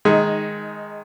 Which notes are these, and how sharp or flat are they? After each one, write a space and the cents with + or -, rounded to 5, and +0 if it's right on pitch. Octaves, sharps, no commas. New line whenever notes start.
D#3 +0 G#3 +0 D#4 +20